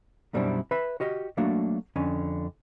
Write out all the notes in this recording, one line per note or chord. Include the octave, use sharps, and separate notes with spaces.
F#2 B2 G3 C4 D4 E4
B4 E5 B5
F#4 G4 D#5
F#3 A3 A#3 D4 F#4
F2 D3 C#4 G#5